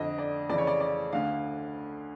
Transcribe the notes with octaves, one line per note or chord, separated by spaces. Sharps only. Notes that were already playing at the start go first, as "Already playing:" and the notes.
Already playing: F2 D3 D#5
D5
F2 C#3 E3 D5
C#5
D5
D5
D2 D3 F5